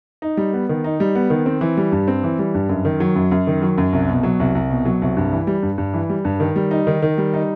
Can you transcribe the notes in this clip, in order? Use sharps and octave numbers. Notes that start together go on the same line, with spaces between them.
D#4
G3
B3
D#3
D#4
G3
B3
D#3
C4
E3
G3
G2
C4
E3
G3
G2
F#2
D#3
F#3
F#2
F#2
D#3
F#3
F#2
C2
B2
F#3
C2
C2
B2
F#3
C2
G2
E3
G3
G2
G2
E3
G3
G2
D#3
G3
D#4
D#3
D#3
G3
D#4